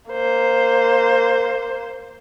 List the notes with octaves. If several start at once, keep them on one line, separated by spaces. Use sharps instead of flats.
A#3 C5